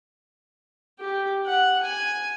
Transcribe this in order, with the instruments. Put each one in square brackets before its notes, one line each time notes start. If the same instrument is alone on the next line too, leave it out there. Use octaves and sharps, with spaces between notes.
[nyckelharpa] G4
F#5
G#5